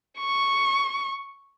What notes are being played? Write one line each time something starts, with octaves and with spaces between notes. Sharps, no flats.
C#6